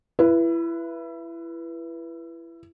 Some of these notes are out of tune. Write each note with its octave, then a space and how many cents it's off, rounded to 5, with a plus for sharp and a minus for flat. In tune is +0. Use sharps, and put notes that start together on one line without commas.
E4 +25 B4 -15